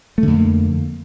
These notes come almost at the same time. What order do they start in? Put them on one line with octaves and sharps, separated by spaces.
A3 D3 F2 A#3